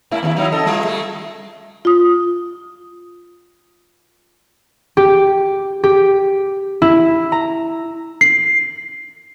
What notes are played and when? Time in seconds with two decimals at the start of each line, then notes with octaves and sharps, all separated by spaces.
0.11 G#2 A#3 E4
0.23 D#2 D3 E4
0.37 F#3 D#4 E4
0.52 C#3 A4 D#5
0.66 G3 F4
0.85 G3 A3
1.85 F4 D#6
4.97 G4
5.84 G4
6.82 E4
7.32 A#5
8.21 C7